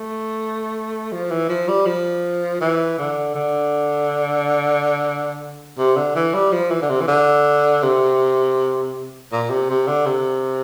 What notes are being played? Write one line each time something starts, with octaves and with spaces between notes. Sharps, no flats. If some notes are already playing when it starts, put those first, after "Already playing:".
Already playing: A3
F3
E3
F3
G3
F3
E3
D3
D3
C3
D3
E3
G3
F3
E3
D3
C3
E3
D3
C3
A#2
C3
C3
D3
C3